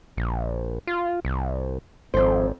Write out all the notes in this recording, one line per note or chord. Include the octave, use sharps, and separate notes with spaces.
A#1
F4
C2
G#1 F2 C5